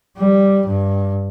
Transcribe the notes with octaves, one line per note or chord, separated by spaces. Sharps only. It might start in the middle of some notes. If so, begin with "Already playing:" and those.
G3
G2